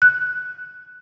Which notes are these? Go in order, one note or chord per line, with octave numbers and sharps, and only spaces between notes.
F#6